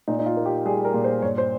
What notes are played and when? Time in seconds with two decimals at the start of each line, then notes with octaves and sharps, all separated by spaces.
0.08 A#2 D#4
0.19 D#4
0.26 F4
0.37 A#3
0.46 G4
0.65 G3 G#4
0.85 A#4
0.94 A#2
1.04 C5
1.22 G2 C#5
1.38 C5